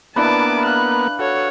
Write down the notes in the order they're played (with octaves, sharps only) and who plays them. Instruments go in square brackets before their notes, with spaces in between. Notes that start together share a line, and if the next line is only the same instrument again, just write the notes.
[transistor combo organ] A#3 B3 [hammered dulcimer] D4 E4 B4 [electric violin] A5 D6
[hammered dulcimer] F5 B5 [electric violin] F#6
[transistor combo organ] F#4 [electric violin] A4 C#5